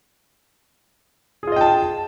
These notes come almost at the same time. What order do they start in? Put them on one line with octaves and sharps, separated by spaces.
G#4 F4 D#5 G5 A5